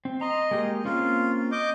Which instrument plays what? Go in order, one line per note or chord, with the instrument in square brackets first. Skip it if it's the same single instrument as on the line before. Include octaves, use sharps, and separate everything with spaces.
[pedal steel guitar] C4
[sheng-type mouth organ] D#5 [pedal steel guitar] A#5 C6
[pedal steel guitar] G#3 A#3 G4
[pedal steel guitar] A#3 C4 C#4 [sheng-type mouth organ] F4
[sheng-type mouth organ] D#5 D6 G6